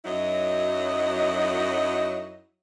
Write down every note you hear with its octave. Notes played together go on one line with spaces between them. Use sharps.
F#2 F#3 D#4 E4 D#5